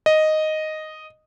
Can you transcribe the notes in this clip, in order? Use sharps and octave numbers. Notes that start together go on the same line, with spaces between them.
D#5